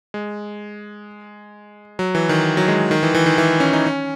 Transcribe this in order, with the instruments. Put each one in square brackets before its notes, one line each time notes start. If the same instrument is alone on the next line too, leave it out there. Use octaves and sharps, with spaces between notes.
[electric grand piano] G#3
F#3
E3
D#3
F#3
G#3
D#3
E3
E3
D#3
E3
C#4
D#4
C#4